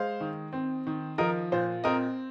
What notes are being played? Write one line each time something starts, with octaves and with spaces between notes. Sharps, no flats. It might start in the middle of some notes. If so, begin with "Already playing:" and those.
Already playing: G#3 C5 F5
D#3
C4
D#3
F3 A#4 D#5
A#2 C5
C4 A#4 D#5